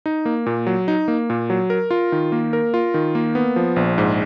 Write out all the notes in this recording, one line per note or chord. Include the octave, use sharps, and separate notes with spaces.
D#4
A#3
A#2
F#3
D#4
A#3
A#2
F#3
A#4
F4
D#3
A#3
A#4
F4
D#3
A#3
B3
F3
A#1
G#2